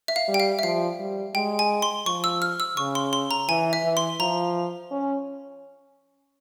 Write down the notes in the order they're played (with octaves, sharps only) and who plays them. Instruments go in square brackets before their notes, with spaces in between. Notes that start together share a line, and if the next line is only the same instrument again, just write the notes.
[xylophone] E5
F5
[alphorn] G3
[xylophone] G5
F5
E5
[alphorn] F3 [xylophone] F5
[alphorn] G3
[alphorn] G#3 [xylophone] G5
[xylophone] G#5
C6
[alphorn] F3 [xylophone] C#6
[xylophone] E6
F6
E6
[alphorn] C#3 [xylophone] C#6
[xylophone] C6
C6
A#5
[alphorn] E3 [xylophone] G#5
[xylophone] E5
[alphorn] E3
[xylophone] C6
[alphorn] F3 [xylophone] A#5
[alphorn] C#4